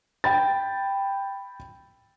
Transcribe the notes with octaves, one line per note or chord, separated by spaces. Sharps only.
G5 B5 A6